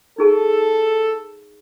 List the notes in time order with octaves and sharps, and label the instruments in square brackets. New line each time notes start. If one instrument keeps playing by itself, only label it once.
[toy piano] D#4 G#4 A5 [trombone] A4